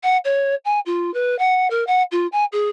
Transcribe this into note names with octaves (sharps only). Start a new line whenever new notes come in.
F#5
C#5
G#5
F4
B4
F#5
A#4
F#5
F4
G#5
G#4